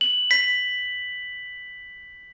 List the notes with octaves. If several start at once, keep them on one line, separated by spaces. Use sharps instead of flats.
F#7
B6